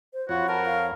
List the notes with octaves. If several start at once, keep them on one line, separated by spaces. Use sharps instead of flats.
C5
F2 F4 F#4 C#5 F#5 B5
A#4 A5
F5